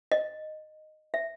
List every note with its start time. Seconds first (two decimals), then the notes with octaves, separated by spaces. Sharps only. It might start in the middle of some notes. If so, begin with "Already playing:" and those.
0.12 D#5
1.14 E5